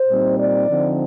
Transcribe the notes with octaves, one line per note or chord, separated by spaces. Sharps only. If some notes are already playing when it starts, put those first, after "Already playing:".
Already playing: C5
A#2 G3 C4 D#4
D5
D3 F3 C4 D#4